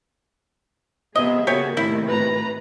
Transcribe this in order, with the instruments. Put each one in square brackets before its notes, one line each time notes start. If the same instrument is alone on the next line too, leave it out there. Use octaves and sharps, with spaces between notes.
[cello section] C3 G#4 [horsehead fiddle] B3 E5 [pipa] D#5
[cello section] C#3 B3 F#4 [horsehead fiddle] A#3 [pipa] G4 C#5 G#5
[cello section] A2 C3 D#3 [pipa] G3 E4
[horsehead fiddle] B4 A#5